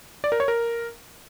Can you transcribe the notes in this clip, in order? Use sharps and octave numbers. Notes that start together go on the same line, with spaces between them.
D5
A#4
C#5
A#4